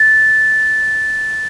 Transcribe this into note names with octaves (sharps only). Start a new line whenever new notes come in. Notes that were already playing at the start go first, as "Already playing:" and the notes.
Already playing: A6